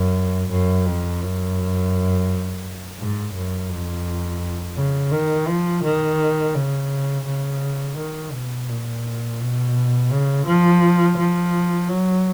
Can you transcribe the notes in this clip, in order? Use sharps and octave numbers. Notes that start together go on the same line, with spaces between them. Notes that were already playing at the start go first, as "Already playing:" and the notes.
Already playing: F#2
F#2
F2
F#2
G#2
F#2
F2
C#3
D#3
F3
D#3
C#3
C#3
D#3
B2
A#2
B2
C#3
F3
F3
F#3